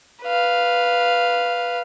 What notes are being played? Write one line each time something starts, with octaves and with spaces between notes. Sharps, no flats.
B4 F5